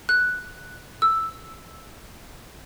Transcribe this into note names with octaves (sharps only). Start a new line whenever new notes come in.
F#6
E6